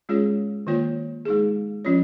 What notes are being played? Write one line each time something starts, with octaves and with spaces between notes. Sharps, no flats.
G#3 C#4 F4 G#4 C#5
D#3 A#3 F4 C#5
G#3 D#4 G#4
F3 C#4 F4 C#5